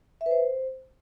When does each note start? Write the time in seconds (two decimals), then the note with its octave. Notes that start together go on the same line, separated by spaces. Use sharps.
0.21 E5
0.26 B4
0.31 C5